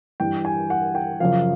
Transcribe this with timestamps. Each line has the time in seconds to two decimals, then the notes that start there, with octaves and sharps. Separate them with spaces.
0.20 G2 E3 G5
0.45 G#5
0.70 F#5
0.95 G5
1.20 F#2 C#3 F3 F5